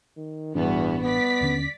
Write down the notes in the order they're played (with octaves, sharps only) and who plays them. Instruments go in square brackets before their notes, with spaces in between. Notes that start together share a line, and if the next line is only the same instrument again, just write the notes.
[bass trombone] D#3
[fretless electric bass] A1 E3 D4 [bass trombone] E2 [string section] G2 B3 F#4
[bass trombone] B3 [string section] D5 B6
[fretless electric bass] D#2 D3 C#4